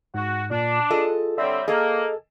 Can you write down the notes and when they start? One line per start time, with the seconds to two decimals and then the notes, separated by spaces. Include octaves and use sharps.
0.14 G#2 F#4
0.51 A#2 D4
0.90 F4 G#4 A4 D#5
1.38 D3 G3 C4 C#5 D5 E5
1.68 A#3 G#4 A4 D#5